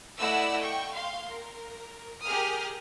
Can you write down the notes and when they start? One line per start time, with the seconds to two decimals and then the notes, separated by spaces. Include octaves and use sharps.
0.19 A3 E4 D5 D#5 F#5 E6
0.60 G5 C#6
0.92 F5 C6
1.28 A#4
2.22 G4 G#4 A#4 D#6 F6